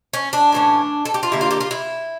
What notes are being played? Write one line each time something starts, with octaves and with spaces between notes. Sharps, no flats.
C#4
D4
A2 E3 A3 C#4
A4
G4
F4
D3 G3 A#3 E4
F4
G4
F4
E4